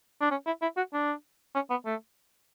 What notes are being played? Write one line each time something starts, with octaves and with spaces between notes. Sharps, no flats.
D4
C#4
E4
E4
F#4
D4
C#4
B3
A3